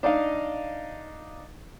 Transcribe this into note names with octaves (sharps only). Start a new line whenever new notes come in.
D4 D#4 D#5 F5